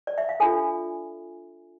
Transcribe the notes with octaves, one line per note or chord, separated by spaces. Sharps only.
D5
E5
F5
D4 F4 A4 G#5